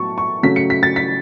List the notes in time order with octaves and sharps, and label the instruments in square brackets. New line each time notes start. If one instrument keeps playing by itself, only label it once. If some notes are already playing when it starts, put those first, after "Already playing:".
Already playing: [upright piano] A2 F#3 B3 A5 C#6
C#6
C#3 F#3 A3 C#4 B6
C#7
B6
A6
B6